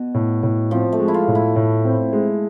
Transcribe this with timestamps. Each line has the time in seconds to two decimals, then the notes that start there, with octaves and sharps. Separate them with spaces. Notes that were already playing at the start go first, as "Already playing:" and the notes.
Already playing: B2
0.14 A2
0.43 A2
0.71 F3 C4
0.93 A3
0.99 G#3
1.08 E4
1.14 F4
1.28 A2
1.35 E4
1.56 A2
1.85 C4
2.13 G#3